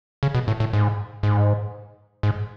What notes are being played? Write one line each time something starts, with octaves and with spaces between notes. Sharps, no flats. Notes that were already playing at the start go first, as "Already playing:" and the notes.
C#3
B2
A2
A2
G#2
G#2
G#2